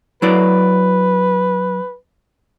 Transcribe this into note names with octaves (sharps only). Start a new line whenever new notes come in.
F#3 E4 B4 D5